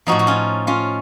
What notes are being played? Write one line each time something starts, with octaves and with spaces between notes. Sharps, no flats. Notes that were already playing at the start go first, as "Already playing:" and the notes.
A2 F3 D#4 F#4
F#4
C#4 F4
C#4 F4